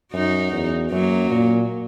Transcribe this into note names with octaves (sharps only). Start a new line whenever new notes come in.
F#2 D#4 F#4
E2
F#2 F#3 A#3
A#2